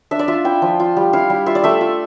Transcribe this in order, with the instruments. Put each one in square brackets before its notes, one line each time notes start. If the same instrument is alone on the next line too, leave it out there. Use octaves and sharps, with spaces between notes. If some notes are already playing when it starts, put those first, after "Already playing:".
[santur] D4 E5
D5
F4 E5
E4 G5
F3
F4
G3
E4 F5
G3
F4 E5
D5
A3 E5
F4